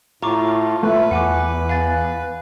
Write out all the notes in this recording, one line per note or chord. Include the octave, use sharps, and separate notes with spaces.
A2 F4 A#5 C#6 D6
A3 B4
E2 F#5 G#5 D6
F5 G#5 A6